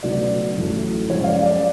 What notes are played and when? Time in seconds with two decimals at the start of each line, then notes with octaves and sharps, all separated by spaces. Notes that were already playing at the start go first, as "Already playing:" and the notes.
0.03 C#2 B2 F#3 A3 D5
0.57 A1 A2 F#3 A3
1.10 F#2 F3 G#3 C#5
1.24 F5
1.28 D5
1.46 D5